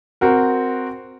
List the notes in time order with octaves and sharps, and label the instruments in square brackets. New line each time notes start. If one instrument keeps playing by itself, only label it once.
[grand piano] C4 F#4 A#4